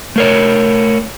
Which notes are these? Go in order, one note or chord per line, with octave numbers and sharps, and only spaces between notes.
A3 A#4 C#5